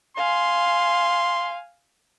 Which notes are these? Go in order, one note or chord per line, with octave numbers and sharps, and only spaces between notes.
F5 G#5 C6